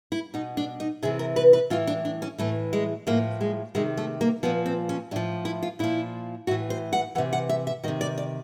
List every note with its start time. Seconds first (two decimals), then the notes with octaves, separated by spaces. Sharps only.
0.12 E4
0.34 B2 D#4
0.57 D4
0.80 D#4
1.03 C3 E3 G#4
1.19 A#4
1.36 B4
1.53 B4
1.70 A2 E3 F4
1.87 D4
2.05 D4
2.22 C#4
2.38 A2 E3 A3
2.73 G#3
3.07 A2 F3 A#3
3.41 G#3
3.75 C3 D#3 G#3
3.97 A3
4.21 A#3
4.43 A#2 F3 B3
4.66 C4
4.89 C#4
5.11 A2 F3 D4
5.45 E4
5.63 F4
5.79 A#2 F3 E4
6.47 A2 E3 F#4
6.70 C5
6.93 F#5
7.15 E3 F#5
7.18 C3
7.33 F#5
7.49 E5
7.67 E5
7.84 D#3 D#5
7.88 C3
8.01 D5
8.18 D5